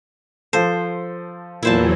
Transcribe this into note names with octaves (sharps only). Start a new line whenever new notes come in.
F3 A4 C5
E2 A#2 E3 F#3 E4 C5 A5